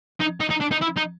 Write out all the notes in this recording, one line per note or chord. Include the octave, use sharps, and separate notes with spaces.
D#4
D#4
D#4
D4
D#4
E4
D#4